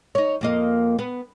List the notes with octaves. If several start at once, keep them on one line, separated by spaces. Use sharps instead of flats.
D#4 C#5
F2 A#3 D#5
B3